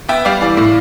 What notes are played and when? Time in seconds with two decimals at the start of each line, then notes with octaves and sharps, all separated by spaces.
0.09 B3 E5 G5
0.25 G3 D5 F5
0.41 E3 D5 F5
0.57 A2